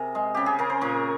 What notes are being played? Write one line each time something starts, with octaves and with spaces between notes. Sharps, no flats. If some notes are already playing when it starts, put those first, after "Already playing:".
Already playing: C3 G#4 A#4
G#3
C#3 G4
G#4
C#3 A#4
C5
A#2 A#4 C#5